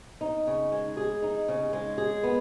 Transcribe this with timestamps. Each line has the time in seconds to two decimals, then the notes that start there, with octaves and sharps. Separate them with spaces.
0.21 D#4
0.47 C#3
0.72 G#3
0.97 G#4
1.22 D#4
1.48 C#3
1.73 G#3
1.98 G#4
2.23 B3